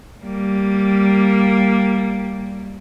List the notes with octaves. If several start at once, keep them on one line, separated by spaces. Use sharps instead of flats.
G3 A#3